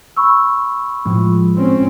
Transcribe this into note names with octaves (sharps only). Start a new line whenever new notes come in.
B5 C#6 E6
A2 F3 G#3
C4 C#4